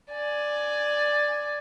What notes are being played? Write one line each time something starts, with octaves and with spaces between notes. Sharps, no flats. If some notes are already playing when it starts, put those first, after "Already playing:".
D5 G#5